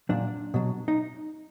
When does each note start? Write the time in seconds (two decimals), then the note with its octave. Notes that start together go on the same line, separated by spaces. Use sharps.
0.09 A#2 F#3 D4
0.54 B2 F#3
0.88 D#4